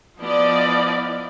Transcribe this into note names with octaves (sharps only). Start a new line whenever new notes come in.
F3 B3 E4 F4 D5 D#5